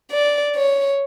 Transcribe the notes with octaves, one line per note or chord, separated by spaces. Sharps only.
D5
C#5